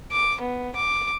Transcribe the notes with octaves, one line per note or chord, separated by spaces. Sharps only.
D6
B3
D6